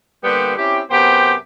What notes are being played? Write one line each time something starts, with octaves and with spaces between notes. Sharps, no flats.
D3 G3 A#3 B3 G4 C5
C4 C#4 E4 G4
F#2 C3 B3 G4 C5 G5